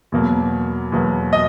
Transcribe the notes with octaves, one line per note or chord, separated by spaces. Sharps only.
E2 B2 F#3 A#3
E2 B2 F#3 A#3
D#5